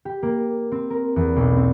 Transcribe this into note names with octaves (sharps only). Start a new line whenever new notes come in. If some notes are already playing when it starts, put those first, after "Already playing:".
G4
A#3
C4
A#4
E2
B1
C4